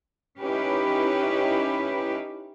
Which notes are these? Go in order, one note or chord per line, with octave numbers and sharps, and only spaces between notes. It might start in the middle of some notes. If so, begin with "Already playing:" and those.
C#4 D#4 E4 G4 B4